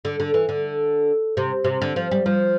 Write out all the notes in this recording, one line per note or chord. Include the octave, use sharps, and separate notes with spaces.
D3
D3
E3
D3
C3
C3
D3
F3
G3
F3